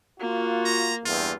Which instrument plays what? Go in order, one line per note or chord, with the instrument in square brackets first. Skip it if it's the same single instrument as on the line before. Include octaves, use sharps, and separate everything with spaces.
[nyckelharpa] A#3 [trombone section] F4 F#4
[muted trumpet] A#5
[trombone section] E2 G2 [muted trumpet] F4